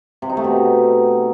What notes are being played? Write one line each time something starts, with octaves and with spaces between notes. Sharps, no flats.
C3
D#4
A3
B2